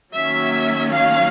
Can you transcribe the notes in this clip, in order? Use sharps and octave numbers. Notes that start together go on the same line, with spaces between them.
D#3 F#3 A#3 C#4 E5
F5